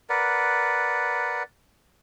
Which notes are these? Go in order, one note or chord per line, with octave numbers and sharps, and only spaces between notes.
A#4 B4 D5 F#5